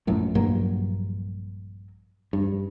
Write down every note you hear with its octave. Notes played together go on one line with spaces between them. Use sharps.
A#1 F#2 A2
A#1 G2 F#3 A#3
G2